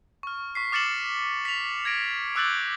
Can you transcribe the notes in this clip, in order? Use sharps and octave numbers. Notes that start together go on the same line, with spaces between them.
C#6 F6
C#6 B6 C7
D6 F6 A6 C#7 E7 F#7
B6 F7
G#6 A#6 D7
D6 E6 F#6 G6 A6 F#7